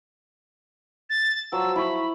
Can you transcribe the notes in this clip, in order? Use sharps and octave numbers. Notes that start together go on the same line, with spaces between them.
A6
F3 F#3 E6
E4 B5 C#6